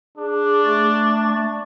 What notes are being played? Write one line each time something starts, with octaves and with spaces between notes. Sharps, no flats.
D4 G#4
A3 C#6 A6